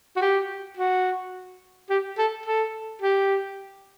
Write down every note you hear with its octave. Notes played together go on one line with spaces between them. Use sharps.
F#4
G4
F#4
G4
A4
A4
G4